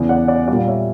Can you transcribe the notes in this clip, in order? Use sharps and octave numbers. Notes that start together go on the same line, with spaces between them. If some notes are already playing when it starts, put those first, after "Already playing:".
Already playing: E2 C#3 E3
D5 F#5
D5
G3 D5
A#2
C#5 E5